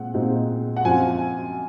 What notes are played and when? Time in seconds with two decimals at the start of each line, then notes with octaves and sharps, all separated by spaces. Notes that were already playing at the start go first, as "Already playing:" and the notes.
Already playing: A#2 G#3 C4 F#5
0.14 A#2 G#3 C4 D#4
0.76 F#5
0.85 F#2 F3 C4 F4 G#5